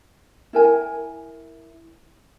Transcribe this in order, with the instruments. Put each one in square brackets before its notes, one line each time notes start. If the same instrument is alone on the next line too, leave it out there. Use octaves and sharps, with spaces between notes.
[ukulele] E4 A#4 G#5